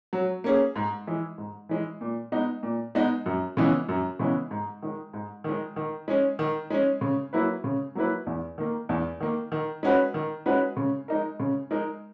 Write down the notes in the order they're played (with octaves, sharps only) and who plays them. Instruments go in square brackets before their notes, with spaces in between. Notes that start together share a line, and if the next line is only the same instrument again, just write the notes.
[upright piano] F#3
A#3 C#4 G#4
G#2
E3 G#3
G#2
E3 G#3
A#2
G#3 B3 D#4
A#2
G#3 B3 D#4
F#2
C#3 E3 G#3 B3
F#2
C#3 E3 G#3 B3
G#2
D#3 G#3
G#2
D#3 G#3
D#3
G#3 C#4
D#3
G#3 C#4
C#3
F#3 A#3 E4 B4
C#3
F#3 A#3 E4 B4
E2
D#3 A#3
E2
D#3 A#3
D#3
G#3 C#4 F#4 B4
D#3
G#3 C#4 F#4 B4
C#3
G#3 D#4 A#4
C#3
G#3 D#4 A#4